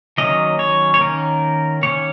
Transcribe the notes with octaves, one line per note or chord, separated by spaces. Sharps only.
D#3 F#3 A#3 C#4 D#5
C#5
C#5
D#3 A#3 C#4 A#4
D#3 A#3 C#4 C#5